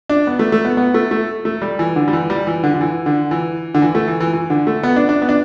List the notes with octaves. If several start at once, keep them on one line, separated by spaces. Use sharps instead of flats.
D4
B3
A3
A3
B3
B3
A3
A3
A3
G3
E3
D3
G3
E3
G3
E3
D3
D3
E3
D3
E3
D3
E3
A3
E3
E3
E3
D3
A3
B3
D4
D4
B3
D4